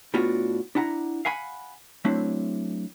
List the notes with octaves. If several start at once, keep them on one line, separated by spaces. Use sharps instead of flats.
A2 B3 D4 F4 F#4
D4 E4 F#5 A5 A#5
F5 F#5 G#5 B5
F#3 A3 C4 D4 E4